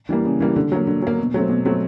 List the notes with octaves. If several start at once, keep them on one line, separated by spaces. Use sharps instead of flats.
E3 G3 A#3
C#3
E3 G3 A#3
D3
F#3 A#3
D3
F#3 A#3
B2
F#3 A3 C4
B2
F#3 A3 C4